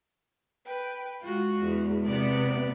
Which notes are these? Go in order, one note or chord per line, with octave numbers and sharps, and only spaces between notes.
B4 G5
G#3 F4 F#4
E2
C3 B3 D5